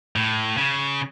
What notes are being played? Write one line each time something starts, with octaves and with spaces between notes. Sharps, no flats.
A2
C#3